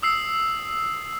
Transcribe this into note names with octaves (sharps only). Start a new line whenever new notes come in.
D#6 E6 C7